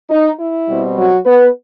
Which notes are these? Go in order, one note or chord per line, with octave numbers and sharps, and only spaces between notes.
D#4
E4
B2 G3 C4
F#3 F#4
B3 B4